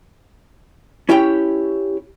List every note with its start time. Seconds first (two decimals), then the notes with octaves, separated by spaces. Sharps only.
1.09 C#4 E4 G4 C#5 G5